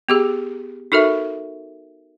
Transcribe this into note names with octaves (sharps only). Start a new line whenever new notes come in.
B3 G4 G#4
D#4 F#4 A4 A#4 E5